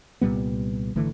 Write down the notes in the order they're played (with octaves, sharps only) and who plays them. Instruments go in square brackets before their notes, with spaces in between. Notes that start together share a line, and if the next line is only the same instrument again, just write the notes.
[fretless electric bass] C2 A#2 G3 B3
G#1 D3 E3 A3